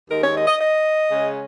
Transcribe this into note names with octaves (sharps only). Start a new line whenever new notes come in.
D#2 D#3 G#3 D#4 A#4
C#5
D#5
D#5
D#5
C#3 G#3 C#4